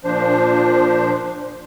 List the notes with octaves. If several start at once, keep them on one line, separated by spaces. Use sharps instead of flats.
A#2 F3 D4 C5